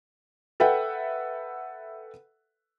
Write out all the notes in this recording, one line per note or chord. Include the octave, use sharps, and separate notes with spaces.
A4 B4 E5 F#5 G5